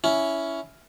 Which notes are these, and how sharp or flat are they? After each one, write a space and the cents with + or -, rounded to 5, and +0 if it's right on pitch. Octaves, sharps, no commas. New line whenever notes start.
C#4 +10 E4 +0